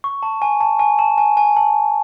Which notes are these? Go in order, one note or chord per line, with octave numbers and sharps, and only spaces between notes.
C#6
A5
G#5
A5
G#5
A5
G#5
G#5
A5